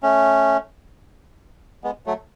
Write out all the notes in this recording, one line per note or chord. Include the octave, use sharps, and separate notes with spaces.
A3 C#4
G#3 B3
F#3 A3